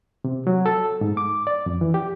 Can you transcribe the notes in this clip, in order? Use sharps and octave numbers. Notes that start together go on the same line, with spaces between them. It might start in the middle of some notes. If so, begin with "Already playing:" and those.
C3
F#3
A4
G#2
D6
D5
F2
E3
G4